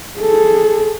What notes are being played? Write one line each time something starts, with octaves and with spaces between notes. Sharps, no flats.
G#4 A4